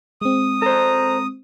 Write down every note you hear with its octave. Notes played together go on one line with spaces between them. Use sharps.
G#3 C4 D#6
A4 C5 A#5